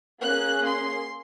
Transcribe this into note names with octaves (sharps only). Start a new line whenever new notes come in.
A#3 C#4 G#4 F#6
C6